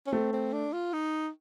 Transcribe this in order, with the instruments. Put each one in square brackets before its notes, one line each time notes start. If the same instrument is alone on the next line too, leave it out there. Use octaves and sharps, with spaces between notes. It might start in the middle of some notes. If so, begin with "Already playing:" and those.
[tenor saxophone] C#4
[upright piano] A3 [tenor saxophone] C4
[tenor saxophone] C4
D4
F4
D#4